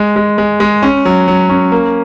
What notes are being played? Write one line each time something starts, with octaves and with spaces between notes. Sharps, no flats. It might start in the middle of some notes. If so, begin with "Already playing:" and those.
Already playing: G#3
G#3
G#3
G#3
C#4
F#3
F#3
C#4
A#3